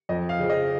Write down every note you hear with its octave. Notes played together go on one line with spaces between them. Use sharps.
F2 D#5
F5
C#3 F3
D#5